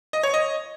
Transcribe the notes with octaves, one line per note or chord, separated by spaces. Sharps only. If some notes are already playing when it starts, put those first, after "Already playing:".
D#5
C#5
D#5